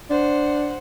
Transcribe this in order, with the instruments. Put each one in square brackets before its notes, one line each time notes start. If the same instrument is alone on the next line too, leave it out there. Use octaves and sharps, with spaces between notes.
[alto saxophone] D4 [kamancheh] C5 F#5